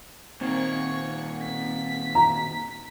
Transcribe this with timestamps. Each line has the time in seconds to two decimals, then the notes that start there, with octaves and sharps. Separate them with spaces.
0.41 A#2 D#3 C4 C#5 C#6
1.43 B6
2.15 A#5